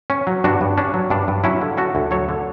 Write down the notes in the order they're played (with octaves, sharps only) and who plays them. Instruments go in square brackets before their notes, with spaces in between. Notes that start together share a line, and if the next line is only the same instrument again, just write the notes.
[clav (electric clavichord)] C#4
F#3
G2 D4 F#4
G2
C#4 D4
F#3
G2 D4
G2
F#3 C#4 E4
D3
C#4 F#4 A4
D2
F#3 A4 C#5
D3